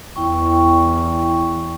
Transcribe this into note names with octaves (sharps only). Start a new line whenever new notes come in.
E2 E4 G5 C#6